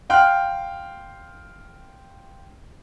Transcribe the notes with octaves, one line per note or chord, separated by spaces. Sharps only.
F5 G5 C6 F6 F#6